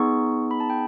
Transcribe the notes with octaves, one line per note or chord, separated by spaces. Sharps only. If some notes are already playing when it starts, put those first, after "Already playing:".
Already playing: B3 D#4 G#4 C#6
B5
A5
G5